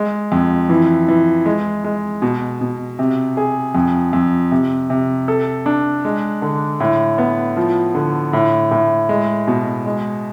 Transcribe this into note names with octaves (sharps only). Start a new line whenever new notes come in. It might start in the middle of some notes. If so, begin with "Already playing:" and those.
Already playing: G#3
F2
E3
E3
G#3
G#3
B2
B2
C3
G#4
F2
F2
C3
C3
A4
D4
G#3
D3
A2
B3
F3
D3
A2
A2
G#3
B2
G#3